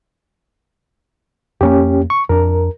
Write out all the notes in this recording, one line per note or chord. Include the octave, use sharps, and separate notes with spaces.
F2 A#3 C#4 G4
C#6
F2 D4 A#4